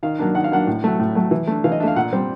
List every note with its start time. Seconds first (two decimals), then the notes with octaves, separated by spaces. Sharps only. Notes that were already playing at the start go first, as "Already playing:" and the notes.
0.03 D#3 F5
0.19 F#3 A#3 D4
0.35 D#3 F#5
0.44 F5
0.52 F#3 A#3 D4 F#5
0.67 A2
0.84 F#3 A3
1.00 A2
1.15 F#3 A3
1.31 E3
1.47 A3 D4
1.64 E3 F5
1.72 D#5
1.80 D4 E5
1.84 A3 F5
1.96 A#2 F#5
2.13 G3 C4